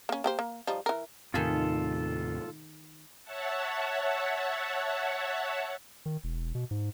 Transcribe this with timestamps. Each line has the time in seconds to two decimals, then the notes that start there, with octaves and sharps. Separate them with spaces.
0.09 A#3 C#4
0.24 A#3 G4 C5
0.39 A#3
0.67 F3 G3 D#4
0.86 E3 A#4
1.34 D#2 A2 C3 D#3 F4 G#4 A4 B5
3.24 C#5 E5 F#5 A5
6.06 D#3
6.24 E1
6.55 B2
6.71 G#2